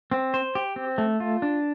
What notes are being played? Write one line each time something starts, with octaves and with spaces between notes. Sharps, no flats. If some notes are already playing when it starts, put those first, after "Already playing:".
C4
C5
G4
C4
A3
F4
D4